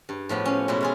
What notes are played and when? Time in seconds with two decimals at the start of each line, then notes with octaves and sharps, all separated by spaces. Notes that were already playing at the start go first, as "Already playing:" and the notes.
0.09 G2
0.29 A2 F3 B3 G4
0.45 C#4 F5
0.68 B2 G3 G#3 C#4 E4
0.81 E4 F4 G#4